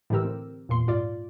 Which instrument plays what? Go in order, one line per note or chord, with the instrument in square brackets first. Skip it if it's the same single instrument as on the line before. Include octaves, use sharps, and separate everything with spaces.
[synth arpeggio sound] A2 D3 E3 G4 A#4 E6
C4
E2 A#2 C6
G#2 F4 D5